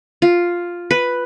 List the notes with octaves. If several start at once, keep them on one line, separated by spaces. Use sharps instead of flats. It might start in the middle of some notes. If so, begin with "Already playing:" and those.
F4
B4